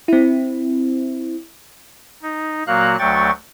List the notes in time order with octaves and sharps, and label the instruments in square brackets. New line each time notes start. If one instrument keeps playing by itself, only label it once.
[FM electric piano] C4 E4
[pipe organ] D#4
A#2 F#3 A#3 F#4 F5 F#6
D2 F#3 A3 G5 C#6 A6